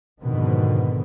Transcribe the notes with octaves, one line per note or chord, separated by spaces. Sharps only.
F2 G#2 B2 D3 D#3 B3